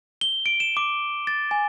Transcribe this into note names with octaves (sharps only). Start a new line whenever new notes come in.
G7
D7
E7
D6
A6
G#5